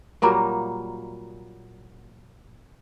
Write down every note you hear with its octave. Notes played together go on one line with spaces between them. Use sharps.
A#2 F#3 G3 A#3